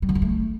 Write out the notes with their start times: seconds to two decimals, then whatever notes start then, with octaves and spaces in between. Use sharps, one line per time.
0.02 G3
0.09 D3
0.15 F#3
0.22 A3